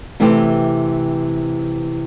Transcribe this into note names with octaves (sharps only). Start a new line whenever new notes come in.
C3 E3 A3 C4 G4